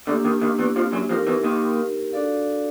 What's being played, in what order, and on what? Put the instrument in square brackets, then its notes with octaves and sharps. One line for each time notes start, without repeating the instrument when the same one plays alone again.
[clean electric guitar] D2 D3 [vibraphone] A#3 D4 G4
[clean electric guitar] D#2 D#3
D#2 D#3
E2 E3
F2 F3
F#2 F#3
[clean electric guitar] F2 F3 [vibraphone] D#4 G4 A#4
[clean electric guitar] E2 E3
D#2 D#3
[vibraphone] D4 F#4 A4 D5 F5